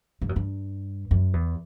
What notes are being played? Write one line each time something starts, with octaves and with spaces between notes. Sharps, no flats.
G2
F#2
G2
F#2
E2